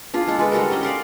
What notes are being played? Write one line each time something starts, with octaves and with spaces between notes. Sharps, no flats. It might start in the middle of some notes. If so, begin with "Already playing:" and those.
D4 F4 G#4
G#3 A4
G#3 B4
G3 F#4 A4 A#4
C#4 G4 D#5 G5
D5 F5 F#5 C6